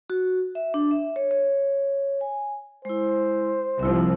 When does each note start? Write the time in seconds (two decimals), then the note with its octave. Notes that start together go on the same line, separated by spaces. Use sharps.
0.10 F#4
0.55 E5
0.74 D4
0.91 E5
1.16 C#5
1.31 C#5
2.21 G#5
2.85 G#3 E4 C5
3.79 C2 F3 C4 E4